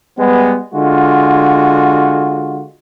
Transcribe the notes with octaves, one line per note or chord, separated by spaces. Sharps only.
G3 G#3 B3
D3 G#3 F4 F#4